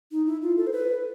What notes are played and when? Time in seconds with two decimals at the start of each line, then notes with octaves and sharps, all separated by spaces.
0.12 D#4
0.26 E4
0.42 F4
0.57 A4
0.67 C5
0.72 B4